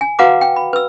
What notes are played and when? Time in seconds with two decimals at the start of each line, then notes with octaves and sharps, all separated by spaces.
0.01 G#5
0.19 F#4 B4 F5 F#5 A#5 D6
0.41 G5
0.56 B5
0.73 B4 E6